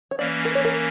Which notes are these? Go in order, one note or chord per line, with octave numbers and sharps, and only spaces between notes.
C#5
E3 A#3 C#4 D5
A#4
C#5
A#4